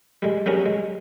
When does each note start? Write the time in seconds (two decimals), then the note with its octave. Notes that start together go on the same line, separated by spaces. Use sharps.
0.22 G3 G#3
0.46 F#3 G3 C#4 G#4 A#4
0.66 G#3